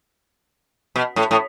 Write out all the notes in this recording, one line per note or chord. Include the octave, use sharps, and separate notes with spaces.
B2
A2
A2